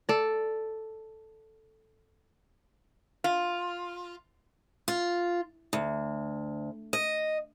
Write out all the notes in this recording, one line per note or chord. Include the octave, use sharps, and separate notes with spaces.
A4 D5
F4
F4
D2
D#5